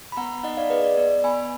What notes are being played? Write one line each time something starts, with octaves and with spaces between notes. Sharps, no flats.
B5
B3 F#5 A#5
D#4 D#5 F#5
D5 F5
G#4 B4 D#5
D5
B3 D5
B3 G#5 B5